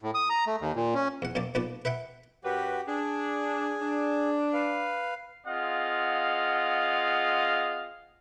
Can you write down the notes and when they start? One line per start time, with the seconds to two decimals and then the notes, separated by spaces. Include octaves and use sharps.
0.02 A2
0.14 D#6
0.30 A#5
0.47 A3
0.61 D#2
0.76 A#2
0.94 C#4
1.22 E2 F#5
1.35 F#2 B2 A#3 D5 A5
1.55 B1 A#2 B3 F#4 D5 A5
1.85 B4 E5 F#5 G5
2.44 F#2 F#4 G4 B4
2.87 D4 G#4
3.81 D4
4.53 B4 F5
5.47 C4 F4 G#4 D#5 F5 F#5